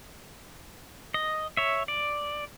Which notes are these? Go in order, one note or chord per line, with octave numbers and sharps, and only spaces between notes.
D#5
C#5 E5
D5